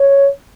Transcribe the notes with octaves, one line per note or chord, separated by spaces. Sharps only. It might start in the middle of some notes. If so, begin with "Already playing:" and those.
Already playing: C#5